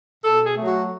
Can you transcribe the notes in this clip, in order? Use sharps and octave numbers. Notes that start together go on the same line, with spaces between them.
B2 A4
G#4
F#3 A3
F#4